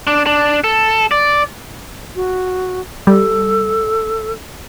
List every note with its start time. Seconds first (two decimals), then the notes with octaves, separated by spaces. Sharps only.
0.07 D4
0.26 D4
0.64 A4
1.11 D5
2.16 F#4
3.07 G3 A4